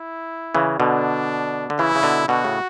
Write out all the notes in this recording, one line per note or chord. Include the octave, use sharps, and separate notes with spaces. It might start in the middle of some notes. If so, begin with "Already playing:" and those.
Already playing: E4
C#3 E3
B2 D3 D4
D3
C#3 E3 E4
C#3
B2 D3
B2 D3 F#4
A2 C#3